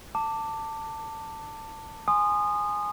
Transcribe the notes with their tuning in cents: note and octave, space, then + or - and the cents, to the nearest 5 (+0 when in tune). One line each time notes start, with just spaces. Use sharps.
A5 +20 D6 +0
G#5 +0 C6 +0 D#6 -20